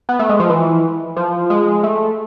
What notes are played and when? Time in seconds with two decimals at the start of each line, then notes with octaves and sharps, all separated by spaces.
0.09 B3
0.19 A3
0.29 G#3
0.40 F3
0.50 E3
1.17 F3
1.50 G#3
1.83 A3